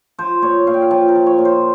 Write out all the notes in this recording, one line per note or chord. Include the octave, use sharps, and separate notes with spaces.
F3 C5
A#2 C#5
A#2 F5
G5
F5
F3 G5
A#4
F3
C#5
A#2
C5